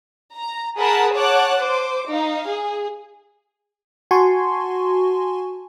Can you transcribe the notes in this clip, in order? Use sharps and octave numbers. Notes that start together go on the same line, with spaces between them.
A#5
G#4 A#4 F#5 A5 B5
C#5 F#5 A5 D6 F#6
C5 D6
D#4 F5
G#4
F#4 G#5 A5 C6 C#6